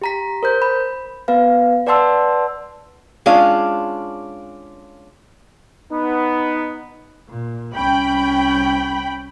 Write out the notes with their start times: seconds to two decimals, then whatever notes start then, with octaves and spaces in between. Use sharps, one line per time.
0.02 G4 A#5 B6
0.43 A#4 C5 G6
0.62 B5
1.28 B3 B4 F5
1.87 B4 D5 F#5 A5 C6 E6
3.26 G#3 C#4 D4 F4 F5
5.92 B3 D#4
7.29 A#2
7.76 C2 C#4 G5 B5